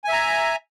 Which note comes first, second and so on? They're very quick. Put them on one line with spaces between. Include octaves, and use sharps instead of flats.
G#5 E5 A#5